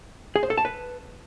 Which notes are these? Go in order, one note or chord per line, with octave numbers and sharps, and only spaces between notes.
G#4
C5
A4
A5
B4